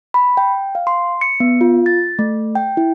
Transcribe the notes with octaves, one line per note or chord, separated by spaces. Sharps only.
B5
G5
F5
C6
C#7
B3
F4
A6
A3
G5
E4